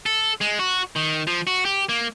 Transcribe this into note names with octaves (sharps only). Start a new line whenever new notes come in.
A4
G#3
F#4
D#3
F3
F#4
G4
A#3